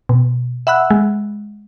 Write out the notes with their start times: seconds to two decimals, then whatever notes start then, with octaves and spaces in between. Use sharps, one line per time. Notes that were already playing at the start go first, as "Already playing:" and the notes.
0.09 B2
0.67 E5 F#5 B5 E6 F#6
0.91 G#3